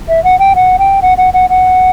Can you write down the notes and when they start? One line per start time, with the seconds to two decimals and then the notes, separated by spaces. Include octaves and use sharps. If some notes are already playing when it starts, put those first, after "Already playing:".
0.09 E5
0.24 F#5
0.39 G5
0.56 F#5
0.79 G5
1.02 F#5
1.18 F#5
1.34 F#5
1.50 F#5